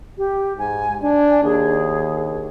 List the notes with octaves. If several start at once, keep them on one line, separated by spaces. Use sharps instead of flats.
G4
G#2 G#5
D4 G#5
D#2 G#4